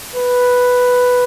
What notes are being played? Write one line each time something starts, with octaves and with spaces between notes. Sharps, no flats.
B4